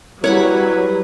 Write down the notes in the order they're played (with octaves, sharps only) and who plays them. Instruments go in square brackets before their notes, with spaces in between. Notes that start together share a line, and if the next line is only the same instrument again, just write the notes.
[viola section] F#3 G3 [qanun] E4 F#5 B5 [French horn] B4 [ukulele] C#5